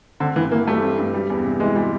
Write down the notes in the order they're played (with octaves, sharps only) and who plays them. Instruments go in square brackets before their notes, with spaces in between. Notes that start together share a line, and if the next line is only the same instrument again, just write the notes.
[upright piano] D3 [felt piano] C4
[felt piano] G2 [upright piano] E3
[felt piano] E3 [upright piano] A#3
[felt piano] G3 [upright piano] A3
[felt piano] C4
G2
G3
E2
C3
[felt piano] E3 [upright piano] G#3
[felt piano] G3